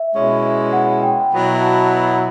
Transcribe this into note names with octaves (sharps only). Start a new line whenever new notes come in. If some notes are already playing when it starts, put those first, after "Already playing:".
Already playing: E5
B2 G#3 C#4 E4
F#5
G5
B2 F#3 B3 E4
A5
A#5